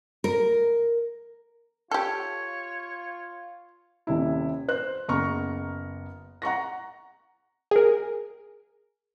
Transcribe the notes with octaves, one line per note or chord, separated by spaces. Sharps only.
A#4
F4 G4 A4 C#5
D#1 C3 E4
C5 F#6
F#1 B3 A#5 C#6 F6
F#5 A#5 C#6 A#6
G#4 A#4